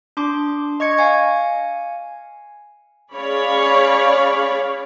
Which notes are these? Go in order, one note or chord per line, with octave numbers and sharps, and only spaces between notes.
D4 C6 D6
D#5 C#6 G#6 C#7
F5 G#5 C#7
C#4 G#4 C#5 D5 F5 B5